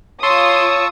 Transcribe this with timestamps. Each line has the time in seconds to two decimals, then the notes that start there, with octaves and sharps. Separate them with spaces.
0.23 F4 C#5 A5 C6 C#6 D#6 E6